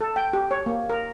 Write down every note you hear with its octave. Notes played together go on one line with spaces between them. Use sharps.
A4
G5
G4
C#5
A#3
A#4